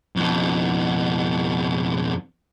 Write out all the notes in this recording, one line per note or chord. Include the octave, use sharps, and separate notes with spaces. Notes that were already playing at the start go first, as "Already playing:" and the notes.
F2 B2